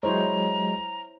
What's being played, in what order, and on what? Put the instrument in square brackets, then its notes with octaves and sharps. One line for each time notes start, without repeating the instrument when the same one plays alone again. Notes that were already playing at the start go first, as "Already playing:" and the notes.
[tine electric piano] F#3 G#3 [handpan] E4 C5 C#5 [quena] A#5